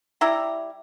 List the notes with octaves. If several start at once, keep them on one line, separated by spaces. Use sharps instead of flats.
G3 E4 A#5